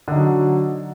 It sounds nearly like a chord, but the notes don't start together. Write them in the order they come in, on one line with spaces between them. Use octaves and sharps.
D3 D#4 F#3